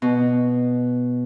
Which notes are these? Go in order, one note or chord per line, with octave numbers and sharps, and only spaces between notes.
B2